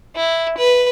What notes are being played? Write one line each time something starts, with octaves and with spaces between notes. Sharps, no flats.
E4
B4